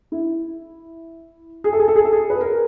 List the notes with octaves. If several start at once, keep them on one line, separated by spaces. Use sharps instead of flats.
E4
G#4
A4
G#4
A4
G#4
A4
G#4
B4
A#4